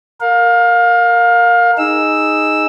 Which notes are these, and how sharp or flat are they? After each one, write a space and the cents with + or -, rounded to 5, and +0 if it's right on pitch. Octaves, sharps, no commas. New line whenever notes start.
A#4 -10 F5 +25
D#4 +0 G#4 +0 E6 +0